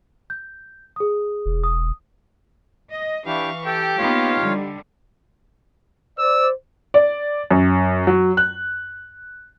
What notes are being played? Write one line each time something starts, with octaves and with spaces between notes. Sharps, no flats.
G6
G#4 D#6
E1
D#6
D#5
E3 D4 E4 G4 F5 C#6
G4 A4 G5
A#3 B3 D#4 F4 C#5 F5
D3 G3
C5 D5 E6
D5
F#2
F#3
F#6